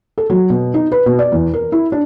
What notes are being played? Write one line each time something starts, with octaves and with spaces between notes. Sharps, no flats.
A4
F#3
B2
D#4
B4
B2
D5
E2
A#4
E4
D4